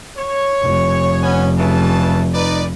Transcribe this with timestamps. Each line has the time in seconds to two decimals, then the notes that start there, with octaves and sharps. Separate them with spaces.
0.17 C#5
0.62 F1
1.22 B3 C#4 G#5
1.58 C#3 E3 A5
2.34 D#4 B4 D5